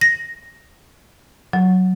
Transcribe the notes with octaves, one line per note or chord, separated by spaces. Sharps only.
A#6
F#3